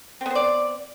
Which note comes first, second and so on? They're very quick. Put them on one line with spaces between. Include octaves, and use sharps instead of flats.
C4 B3 C5 D5